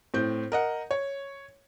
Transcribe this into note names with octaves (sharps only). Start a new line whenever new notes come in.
A2 C4 G6
A#4 D#5 F#5
C#5